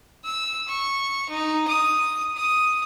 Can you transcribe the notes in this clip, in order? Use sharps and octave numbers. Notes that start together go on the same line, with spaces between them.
E6
C#6
D#4
D#6
D#6